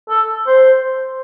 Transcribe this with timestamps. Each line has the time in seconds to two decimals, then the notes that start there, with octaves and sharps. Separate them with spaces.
0.09 A4
0.47 C5